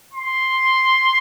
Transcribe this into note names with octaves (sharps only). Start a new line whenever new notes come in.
C6